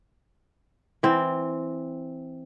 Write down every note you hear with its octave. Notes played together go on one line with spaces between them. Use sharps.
E3 C4